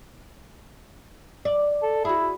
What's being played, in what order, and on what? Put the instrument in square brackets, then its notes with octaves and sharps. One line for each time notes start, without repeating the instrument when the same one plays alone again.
[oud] D5
[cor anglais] A4
[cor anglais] E4 [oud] F#4 G#4